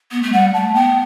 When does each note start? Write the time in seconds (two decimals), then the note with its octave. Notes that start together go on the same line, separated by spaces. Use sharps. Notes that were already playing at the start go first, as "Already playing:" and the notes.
0.11 B3
0.23 A3
0.32 G3 F#5
0.53 A3 A5
0.74 B3 G5